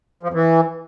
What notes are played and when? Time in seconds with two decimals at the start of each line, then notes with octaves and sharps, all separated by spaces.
0.23 F3
0.28 F2
0.34 E3